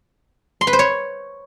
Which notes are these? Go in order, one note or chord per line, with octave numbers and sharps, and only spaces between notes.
C6
B4
C5
C#5